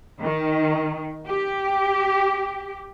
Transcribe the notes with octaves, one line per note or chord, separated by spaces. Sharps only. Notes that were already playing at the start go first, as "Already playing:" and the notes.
D#3
G4